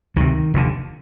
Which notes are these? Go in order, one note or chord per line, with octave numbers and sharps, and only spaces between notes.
D2 C3 D#3
F1 D#2 D3